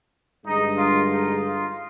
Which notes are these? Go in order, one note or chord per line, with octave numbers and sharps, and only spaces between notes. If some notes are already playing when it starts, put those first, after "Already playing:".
G2 D3 G#3 D#4
F4
D#4
F4